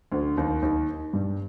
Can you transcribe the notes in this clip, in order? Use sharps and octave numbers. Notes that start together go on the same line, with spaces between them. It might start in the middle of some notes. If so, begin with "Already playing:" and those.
D2 D3
D#2 D#3
D#2 D#3
G2 G3